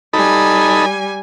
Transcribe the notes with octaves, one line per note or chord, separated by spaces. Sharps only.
G3 D#4 A4 G#5 B5